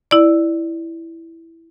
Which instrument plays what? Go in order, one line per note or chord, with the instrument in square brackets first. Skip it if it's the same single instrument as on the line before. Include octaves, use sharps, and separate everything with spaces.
[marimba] E4 D5